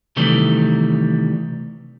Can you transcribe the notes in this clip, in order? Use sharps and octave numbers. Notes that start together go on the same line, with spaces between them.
C3 D#3 E3 G3 A3